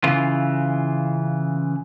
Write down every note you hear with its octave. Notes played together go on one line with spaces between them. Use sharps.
C#3 E3 F4